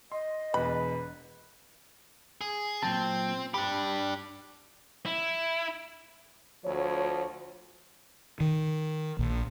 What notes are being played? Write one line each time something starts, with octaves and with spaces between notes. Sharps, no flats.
D#5 C6
E1 E2 B4 B5
G#4
A#2 F#3 C4 A5
D4 G4 B5
E4
D2 F3 C#5
D#3
A#1